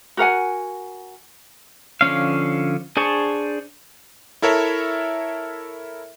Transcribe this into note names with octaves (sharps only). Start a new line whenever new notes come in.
F#4 A#4 F#5 G#5
D3 F3 C#4 F5
D4 G#4 C5 A5 C#6
E4 A4 A#4 C#5 E5